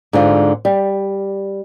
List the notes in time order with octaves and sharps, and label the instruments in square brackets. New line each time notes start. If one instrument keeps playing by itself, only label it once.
[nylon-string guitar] G#2 D3 F4
G3